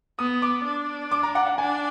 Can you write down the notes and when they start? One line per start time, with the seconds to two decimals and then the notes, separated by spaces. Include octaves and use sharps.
0.19 B3 D#6
0.42 D6
0.65 D4
1.11 D6
1.23 A#5
1.35 F#5
1.47 F#5
1.58 D4 G#5